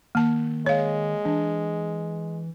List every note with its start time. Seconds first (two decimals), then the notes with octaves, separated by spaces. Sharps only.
0.15 D#3 A#3 A5
0.66 G#3 C#5 F5
1.25 E3 D4